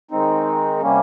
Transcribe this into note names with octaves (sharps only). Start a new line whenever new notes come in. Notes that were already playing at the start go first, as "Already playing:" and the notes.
D#3 G#3 C4 D#4
C3 G3 A#3 C#4